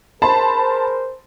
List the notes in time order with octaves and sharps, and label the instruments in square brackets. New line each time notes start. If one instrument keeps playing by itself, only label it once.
[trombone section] G#4 A#4 C5 [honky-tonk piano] A5 B5 C6